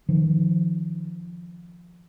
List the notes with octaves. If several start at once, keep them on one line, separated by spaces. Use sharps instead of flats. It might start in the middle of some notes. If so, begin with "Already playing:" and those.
D#3 F3